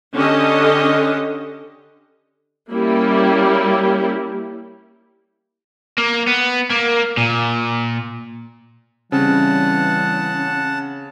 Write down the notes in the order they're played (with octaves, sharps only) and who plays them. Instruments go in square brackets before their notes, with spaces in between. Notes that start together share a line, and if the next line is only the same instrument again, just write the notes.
[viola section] D3 C#4 G4 A4 D#5
G3 A#3 C#4 E4 G4
[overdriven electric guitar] A#3
B3
A#3
A#2
[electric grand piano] C#3 C4 [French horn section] E3 G3 [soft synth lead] C#4 [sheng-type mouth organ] F#5 A5